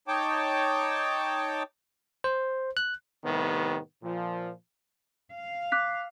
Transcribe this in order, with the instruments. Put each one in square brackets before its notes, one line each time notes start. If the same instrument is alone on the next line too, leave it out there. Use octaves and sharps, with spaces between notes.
[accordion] D#4 C#5 G5 A5 D6
[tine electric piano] C5
F#6
[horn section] A2 C3 D#3 G3 B3
A#2 F3
[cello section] F5
[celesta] D6 F#6 B6